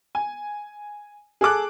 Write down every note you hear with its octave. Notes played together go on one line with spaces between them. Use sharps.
G#5
G#4 A4 D6 F#6